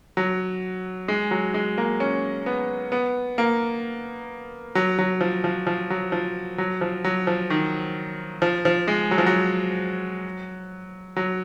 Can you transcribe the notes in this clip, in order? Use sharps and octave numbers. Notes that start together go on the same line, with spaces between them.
F#3
G#3
F#3
G#3
A#3
C#4
B3
B3
A#3
F#3
F#3
F3
F3
F3
F#3
F3
F#3
F3
F#3
F3
D#3
F3
F3
G#3
F#3
F3
F#3
F#3